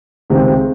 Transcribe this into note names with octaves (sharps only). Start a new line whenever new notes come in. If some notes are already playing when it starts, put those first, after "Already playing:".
C#2 C3 D#3 G#3 C4